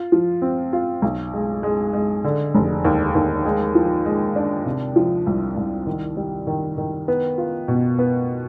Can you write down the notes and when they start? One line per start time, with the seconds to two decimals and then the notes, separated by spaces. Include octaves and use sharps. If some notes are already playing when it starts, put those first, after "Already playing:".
Already playing: F4
0.12 F3
0.42 C4
0.73 F4
1.02 B1
1.33 G#3
1.63 G#3
1.93 G#3
2.24 D3
2.55 F1
2.85 D#2
3.15 D#2
3.45 G#3
3.75 F3
4.05 G#3
4.36 D4
4.66 C3
4.96 F3
5.27 C2
5.57 C2
5.87 D#3
6.17 G3
6.47 D#3
6.78 D#3
7.08 B3
7.38 F4
7.68 B2
7.99 B3